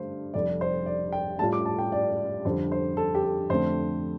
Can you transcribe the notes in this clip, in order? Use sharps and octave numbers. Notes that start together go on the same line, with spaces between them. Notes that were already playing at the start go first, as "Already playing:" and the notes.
Already playing: G2 D3 A3 C5
F1 F2 C3 G3 D5
C5
D5
G5
A2 G3 F4 A5
D6
A5
G5
D5
F2 D3 G3 C5
C5
A4
G4
A4
F2 D3 A3 C4 C5